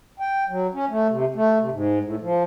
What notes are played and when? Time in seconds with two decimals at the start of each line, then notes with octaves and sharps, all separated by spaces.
0.20 G5
0.48 F#3
0.74 C#4
0.89 A3
1.09 C3
1.35 A3
1.60 C3
1.72 G#2
2.04 A2
2.21 F3